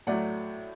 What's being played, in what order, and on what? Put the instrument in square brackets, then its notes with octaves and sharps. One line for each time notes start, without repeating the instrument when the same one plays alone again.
[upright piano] A2 F#3 A3 D5 F#5